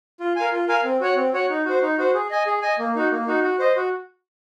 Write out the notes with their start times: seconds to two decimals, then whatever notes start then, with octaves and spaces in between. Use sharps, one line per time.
0.20 F4
0.36 A#4 F5 G#5
0.52 F4
0.68 A#4 F5 G#5
0.84 C4
1.01 F#4 C#5 F#5
1.16 C4
1.33 F#4 C#5 F#5
1.50 D#4
1.66 F#4 C5
1.82 D#4
1.98 F#4 C5
2.14 G#4
2.30 D#5 G#5
2.46 G#4
2.62 D#5 G#5
2.79 A#3
2.95 D#4 F#4
3.12 A#3
3.27 D#4 F#4
3.43 F#4
3.59 C5 D#5
3.76 F#4